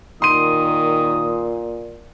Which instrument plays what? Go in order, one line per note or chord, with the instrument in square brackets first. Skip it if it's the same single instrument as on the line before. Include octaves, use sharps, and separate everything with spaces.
[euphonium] A#2 [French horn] D#3 [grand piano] C6 D#7 [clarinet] D#6